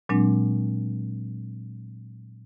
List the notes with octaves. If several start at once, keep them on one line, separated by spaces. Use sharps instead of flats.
A#2 F#3 G#3 C4 D4